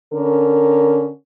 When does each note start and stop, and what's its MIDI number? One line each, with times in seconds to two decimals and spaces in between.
0.13 1.09 50
0.13 1.09 61
0.13 1.09 70